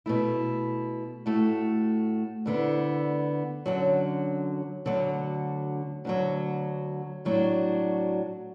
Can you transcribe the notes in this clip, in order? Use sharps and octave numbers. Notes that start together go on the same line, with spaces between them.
B2 A3 E4
A2 A3 F#4
D2 D3 B3 E4
F#2 D3 F#3
D2 D3 F#3
D2 D3 F#3
A2 F#3 D4 F#4